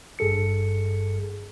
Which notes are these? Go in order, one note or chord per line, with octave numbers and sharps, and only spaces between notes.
G#1 G2 G#4 A4 C#7